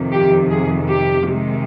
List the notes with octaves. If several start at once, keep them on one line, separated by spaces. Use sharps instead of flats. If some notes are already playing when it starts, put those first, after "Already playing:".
Already playing: F2 C3 D#3
G4
G#4
G4
C3 D#3 G#3